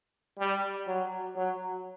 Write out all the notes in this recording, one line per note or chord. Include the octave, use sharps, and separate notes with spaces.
G3
F#3
F#3